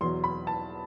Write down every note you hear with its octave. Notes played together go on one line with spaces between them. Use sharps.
E2 B2 F#3 C6
B5
A5